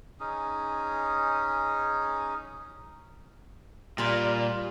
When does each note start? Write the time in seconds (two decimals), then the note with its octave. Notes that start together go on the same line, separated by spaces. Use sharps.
0.20 C#4 D#4 G#4
3.98 A#2 G3 F4